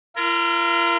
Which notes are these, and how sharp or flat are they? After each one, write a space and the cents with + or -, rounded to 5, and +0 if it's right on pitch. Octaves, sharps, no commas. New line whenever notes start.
F4 -45 A#4 +0